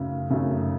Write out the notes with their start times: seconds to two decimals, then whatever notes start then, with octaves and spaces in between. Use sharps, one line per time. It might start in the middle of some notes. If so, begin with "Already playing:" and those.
Already playing: F#2 C#3 A3 D#4
0.30 F#2 C#3 A3 D#4